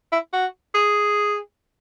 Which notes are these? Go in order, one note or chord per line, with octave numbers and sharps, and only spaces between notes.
E4
F#4
G#4